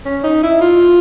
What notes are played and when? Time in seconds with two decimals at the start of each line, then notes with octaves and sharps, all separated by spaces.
0.05 C#4
0.24 D#4
0.43 E4
0.61 F4